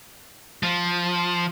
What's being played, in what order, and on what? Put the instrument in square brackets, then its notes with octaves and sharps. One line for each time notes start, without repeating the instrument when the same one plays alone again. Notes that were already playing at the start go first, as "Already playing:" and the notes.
[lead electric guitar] F3